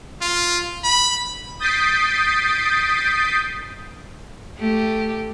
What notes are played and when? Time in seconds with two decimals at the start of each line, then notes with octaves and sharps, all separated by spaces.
0.21 F4
0.84 B5
1.59 D#6 G6 A6 B6 C7 D7
4.57 A3 G4